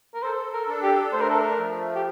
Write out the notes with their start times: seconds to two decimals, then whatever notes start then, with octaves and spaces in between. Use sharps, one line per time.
0.14 A#4
0.23 A4 C5
0.54 A#4
0.68 D4
0.83 G4
1.12 A3 C5
1.21 A#4
1.30 A4
1.38 A#4
1.57 F3
1.96 G4